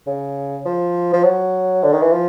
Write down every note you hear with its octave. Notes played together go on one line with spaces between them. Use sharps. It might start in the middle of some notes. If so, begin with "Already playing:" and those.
C#3
F3
F3
F#3
D3
D#3
E3
F3